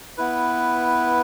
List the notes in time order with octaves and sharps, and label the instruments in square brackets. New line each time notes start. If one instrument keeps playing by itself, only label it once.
[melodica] B3 E4 B4